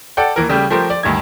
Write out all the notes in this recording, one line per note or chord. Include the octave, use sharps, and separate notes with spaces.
A4 D5 F#5 G5
D#2 E3 A#4
C#3 G3 A3 G4
F3 A3 G4 A#4 C5
D5
D2 G2 D#3 G#6